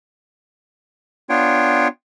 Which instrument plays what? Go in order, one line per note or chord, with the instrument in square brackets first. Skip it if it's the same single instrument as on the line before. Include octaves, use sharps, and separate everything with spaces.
[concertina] B3 D4 F4 C#5 G5